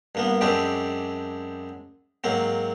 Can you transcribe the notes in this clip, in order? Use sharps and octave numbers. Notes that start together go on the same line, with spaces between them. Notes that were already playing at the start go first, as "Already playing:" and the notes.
G2 A#3 B3
F#2 G#3 C4 D4 E4 G4
G#2 F#3 A#3 C4